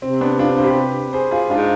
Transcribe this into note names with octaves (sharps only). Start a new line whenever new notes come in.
C3 C4
B3 D4
D4 F4
C5
G4 B4
G#4 C5
F4 G#4
G#2 D4 F4